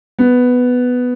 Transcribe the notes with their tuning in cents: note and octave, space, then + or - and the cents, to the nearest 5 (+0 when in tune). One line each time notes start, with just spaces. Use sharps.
B3 +5